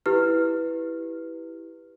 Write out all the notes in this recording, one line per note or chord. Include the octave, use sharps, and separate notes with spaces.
E4 G4 B4 F6